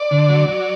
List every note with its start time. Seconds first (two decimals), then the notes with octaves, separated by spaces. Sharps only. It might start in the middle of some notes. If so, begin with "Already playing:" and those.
Already playing: D5
0.11 D3
0.29 F#3
0.48 F#3